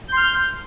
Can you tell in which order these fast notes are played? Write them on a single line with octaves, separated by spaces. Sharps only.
G6 C6 F6